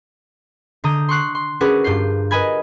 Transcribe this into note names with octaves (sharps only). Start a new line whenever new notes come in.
D3 A#5 D#6 G6
C6 C#6 F#6 C7
C6
C#4 D4 F#4 G#4 A#4 B4
G2 F4 G6 C7
A#4 B4 D#5 G#5 B5 G#6